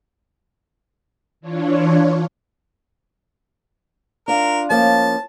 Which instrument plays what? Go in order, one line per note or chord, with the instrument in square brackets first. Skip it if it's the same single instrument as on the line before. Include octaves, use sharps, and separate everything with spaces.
[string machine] E3 D4 F4 C#5
[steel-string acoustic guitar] D4 F4 [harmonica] A#4
[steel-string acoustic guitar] F3 A#3 C#4 [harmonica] A5